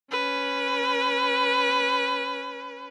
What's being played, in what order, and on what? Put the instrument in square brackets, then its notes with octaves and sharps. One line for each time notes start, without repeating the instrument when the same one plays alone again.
[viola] C#4 B4